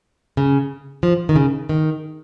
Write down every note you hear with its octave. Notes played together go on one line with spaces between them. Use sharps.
C#3
F3
D#3
C#3
D#3